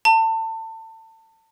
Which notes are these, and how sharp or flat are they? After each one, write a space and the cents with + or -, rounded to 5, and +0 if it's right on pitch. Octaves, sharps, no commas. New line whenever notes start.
A5 +30